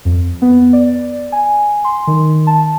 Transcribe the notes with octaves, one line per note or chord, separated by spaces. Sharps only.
F2
B3
D5
G#5
C6
D#3
A5